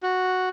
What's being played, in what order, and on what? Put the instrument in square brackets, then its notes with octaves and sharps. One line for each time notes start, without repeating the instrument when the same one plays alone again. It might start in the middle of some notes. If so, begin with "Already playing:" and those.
[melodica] F#4